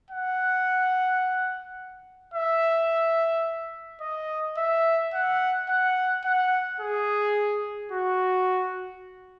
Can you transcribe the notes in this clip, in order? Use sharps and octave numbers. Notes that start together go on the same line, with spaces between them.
F#5
E5
D#5
E5
F#5
F#5
F#5
G#4
F#4